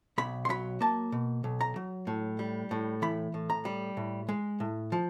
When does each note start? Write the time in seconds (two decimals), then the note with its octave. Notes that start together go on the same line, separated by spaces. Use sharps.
0.18 B1 B5
0.45 C6
0.49 F#3 B5
0.81 A#3 A5
1.12 B2
1.44 B1
1.61 A#5
1.76 F#3
2.07 A2
2.39 G3
2.71 A2
3.02 E3 B5
3.34 A2
3.50 A#5
3.65 G3
3.97 A2
4.29 G#3
4.60 A2
4.92 F3